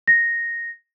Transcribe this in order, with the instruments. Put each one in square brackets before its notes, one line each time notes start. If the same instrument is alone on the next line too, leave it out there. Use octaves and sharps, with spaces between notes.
[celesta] A#6